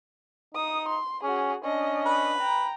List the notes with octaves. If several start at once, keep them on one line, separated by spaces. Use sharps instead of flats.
D#4 D#6
C6
C#4 F#4 G#4
C#4 D4 D#5
B4
G5 A#5